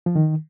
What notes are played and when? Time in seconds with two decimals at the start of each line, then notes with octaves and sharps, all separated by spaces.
0.06 F3
0.15 D#3